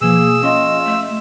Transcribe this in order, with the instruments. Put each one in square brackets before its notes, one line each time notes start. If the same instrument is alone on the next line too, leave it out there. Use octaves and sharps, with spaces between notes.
[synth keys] B2 F3 [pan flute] A#3 [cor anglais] G#4 [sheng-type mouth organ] E6
[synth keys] C#4 [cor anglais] F4 [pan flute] D#5
[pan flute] A3